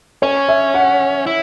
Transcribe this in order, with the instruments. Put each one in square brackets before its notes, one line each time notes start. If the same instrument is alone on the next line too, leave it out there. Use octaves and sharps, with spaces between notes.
[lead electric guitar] C#4 [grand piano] C#5
[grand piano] E5
F#5
[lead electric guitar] E4